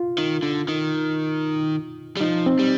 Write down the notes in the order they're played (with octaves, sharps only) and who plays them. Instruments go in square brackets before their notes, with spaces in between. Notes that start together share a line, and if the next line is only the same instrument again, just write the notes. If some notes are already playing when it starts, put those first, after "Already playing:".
Already playing: [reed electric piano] F4
[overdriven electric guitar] D#3
D3
D#3
G3
[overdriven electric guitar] F3 [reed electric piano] D#4
[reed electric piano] C4
[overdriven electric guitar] G3